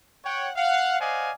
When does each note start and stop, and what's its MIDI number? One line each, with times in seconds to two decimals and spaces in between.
0.25 0.50 73
0.25 0.50 78
0.25 0.50 79
0.56 0.98 77
0.56 0.98 78
1.00 1.32 72
1.00 1.32 74
1.00 1.32 75
1.00 1.32 77
1.00 1.32 78
1.00 1.32 80